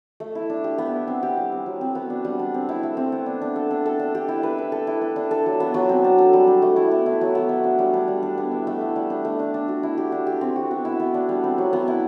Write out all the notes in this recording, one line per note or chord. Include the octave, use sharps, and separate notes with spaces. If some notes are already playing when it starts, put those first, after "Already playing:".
A3
E4
D4
G4
B3
E4
C4
G4
G3
C4
F#3
C4
B3
D4
G3
D4
C4
E4
A3
C4
B3
D4
D4
A4
D4
A4
D4
G4
E4
B4
E4
A4
E4
B4
D4
A4
F#3
B3
F#3
C4
D4
A4
G3
D4
A3
E4
B3
E4
F#3
B3
A3
D4
G3
D4
G3
D4
B3
E4
A3
E4
G3
D4
A3
D4
D4
F#4
E4
G4
D4
G4
C4
F#4
B3
E4
B3
D4
G3
C4
F#3
B3
E4